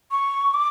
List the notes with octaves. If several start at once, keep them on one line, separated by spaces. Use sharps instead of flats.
C#6
D6